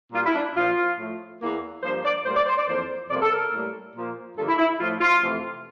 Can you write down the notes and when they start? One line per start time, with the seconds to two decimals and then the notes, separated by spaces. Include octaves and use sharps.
0.13 A#2 G3 A#3 F4
0.25 E4
0.34 D4
0.55 A#2 F3 A#3 F4
0.97 A2 F3 A3
1.40 E2 E3 A#3
1.82 G2 F3 A#3 C5
2.04 D5
2.25 A2 G3 A#3 C5
2.35 D5
2.46 C5
2.57 D5
2.67 F2 E3 A#3 C5
3.10 F2 C3 G3 A#3 D5
3.21 A4
3.31 A#4
3.52 A2 G3 A#3
3.94 A#2 F3 A#3
4.37 G2 D3 F3 A#3 A4
4.48 E4
4.58 E4
4.79 A2 F3 A3 F4
5.01 F4
5.22 F2 C3 E3 A3